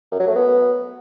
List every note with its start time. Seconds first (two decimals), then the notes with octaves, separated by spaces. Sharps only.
0.12 F#2
0.20 F#3
0.28 A3
0.36 B3